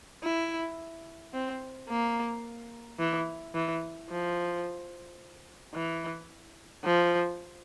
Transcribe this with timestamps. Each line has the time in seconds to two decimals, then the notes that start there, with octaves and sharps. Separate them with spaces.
0.24 E4
1.34 C4
1.89 A#3
2.99 E3
3.54 E3
4.10 F3
5.74 E3
6.85 F3